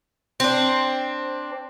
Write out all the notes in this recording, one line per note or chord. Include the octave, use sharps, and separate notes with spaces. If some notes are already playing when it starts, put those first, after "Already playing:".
C4 D4